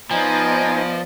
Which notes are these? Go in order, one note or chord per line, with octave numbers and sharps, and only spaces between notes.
F3 B3 D#4 C5 D5 D#5 G#5